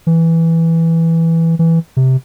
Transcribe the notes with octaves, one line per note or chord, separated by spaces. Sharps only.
E3
E3
C3